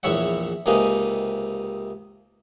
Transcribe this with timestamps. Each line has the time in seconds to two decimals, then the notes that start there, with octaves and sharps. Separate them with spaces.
0.03 A#1 E2 E4 C#5 E5 F#5
0.66 C#2 C3 A#3 D#4 B4 G#5